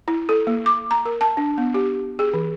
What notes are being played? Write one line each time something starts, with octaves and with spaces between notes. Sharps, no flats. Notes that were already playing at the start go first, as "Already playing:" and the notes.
E4
A4
A#3
D6
A#5
A#4
A5
D4
B3
G4
G#4
E3